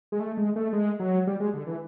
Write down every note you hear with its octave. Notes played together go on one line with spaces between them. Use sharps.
G#3
A3
G#3
A3
G#3
F#3
G3
G#3
D3
E3